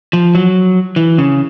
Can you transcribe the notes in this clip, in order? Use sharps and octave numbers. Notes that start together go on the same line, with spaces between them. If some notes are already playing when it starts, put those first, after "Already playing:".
F3
F#3
E3
C#3